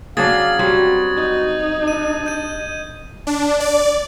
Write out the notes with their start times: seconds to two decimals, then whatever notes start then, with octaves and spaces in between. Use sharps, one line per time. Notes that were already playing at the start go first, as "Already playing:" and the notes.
0.17 C#3 F#3 D4 F5 D#6 G#6 A6
0.59 F#3 G3 C4 F#4
1.17 D#4
1.88 D4 D#7
2.26 D#5 G6 D#7
3.27 D4
3.60 D5